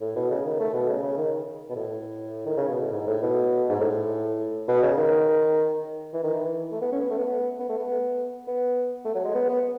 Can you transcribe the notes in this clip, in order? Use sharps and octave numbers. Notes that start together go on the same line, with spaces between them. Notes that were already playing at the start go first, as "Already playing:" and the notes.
A2
B2
C#3
D#3
A3
B2
C#3
C#3
D#3
B2
A2
D#3
C#3
B2
A2
G#2
A2
B2
G#2
A2
B2
C#3
D#3
E3
D#3
E3
A3
B3
C#4
B3
A3
B3
B3
A3
B3
B3
A3
F#3
G#3
B3
B3